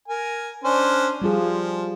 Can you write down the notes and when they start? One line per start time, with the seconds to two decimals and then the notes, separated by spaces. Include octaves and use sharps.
0.08 A#4 G#5
0.64 C#4 D4 C5
1.22 F3 G3 F4 G#4